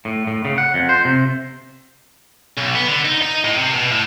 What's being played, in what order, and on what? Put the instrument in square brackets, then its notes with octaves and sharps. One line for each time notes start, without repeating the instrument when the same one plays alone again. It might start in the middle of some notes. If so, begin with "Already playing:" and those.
[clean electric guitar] A2
A2
C#3
F#5
F2
C5
C3
[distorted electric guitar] B1
B3
D3
D#4
D#4
A2
C3
B2
A2